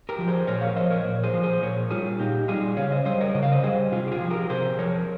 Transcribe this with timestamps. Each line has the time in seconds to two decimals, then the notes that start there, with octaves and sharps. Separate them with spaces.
0.09 G4 A#4
0.19 F3
0.28 G#4 C5
0.47 A#2 A#4 C#5
0.61 C#5 F5
0.76 F3 C5 D#5
0.90 A#4 C#5
1.05 A#2
1.24 G#4 C5
1.34 F3
1.43 G#4 C5
1.62 A#2 A#4 C#5
1.90 G3 F4 G#4
2.20 A#2 D#4 G4
2.48 G3 F4 G#4
2.77 C#3 C#5 F5
2.92 C5 D#5
3.06 G3 C5 D#5
3.21 A#4 C#5
3.35 C#3 D#5
3.43 F5
3.51 C5 D#5
3.63 G3 G#4 C5
3.92 C3 F4 G#4
4.08 G4
4.11 F4 G#4
4.20 F3
4.31 G4 A#4
4.50 C3 G#4 C5
4.79 F3 A#4 C#5